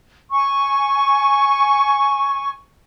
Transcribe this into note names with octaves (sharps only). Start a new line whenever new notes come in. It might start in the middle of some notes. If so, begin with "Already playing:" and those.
G#5 C#6